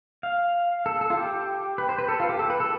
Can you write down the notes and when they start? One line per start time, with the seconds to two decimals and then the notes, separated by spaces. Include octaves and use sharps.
0.23 F5
0.86 A4
1.01 A4
1.10 F4
1.17 G4
1.78 B4
1.89 C5
1.99 B4
2.09 A4
2.20 F4
2.29 G4
2.39 A4
2.50 B4
2.60 A4